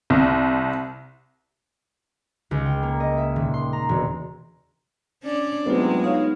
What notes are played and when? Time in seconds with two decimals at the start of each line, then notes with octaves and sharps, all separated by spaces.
0.10 C2
2.51 C#2
2.66 G5
2.83 A#3
3.00 D#5
3.17 E5
3.36 D#1
3.54 C6
3.73 A#5
3.89 E1
5.23 C#4 D4 D5
5.66 E2 G#2 C3 F#3 G#3 A3 B3 F4
6.04 D#4 F#4 C#5 F5